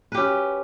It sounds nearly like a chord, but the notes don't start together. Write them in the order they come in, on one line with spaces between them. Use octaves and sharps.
B4 G4 C#4